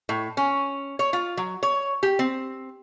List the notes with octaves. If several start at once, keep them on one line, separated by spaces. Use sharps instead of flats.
A2
C#4
C#5
F4
F#3
C#5
G4
C4